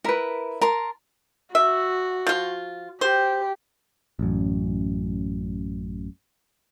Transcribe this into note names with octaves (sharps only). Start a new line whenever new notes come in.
E4 A#4 B4
A#4 A5 A#5 C6
F#4 E5
F3 F4
G4 C5
A1 F#2